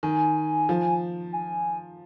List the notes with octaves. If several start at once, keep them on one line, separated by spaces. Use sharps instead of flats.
D#3 G#5
F3
G#5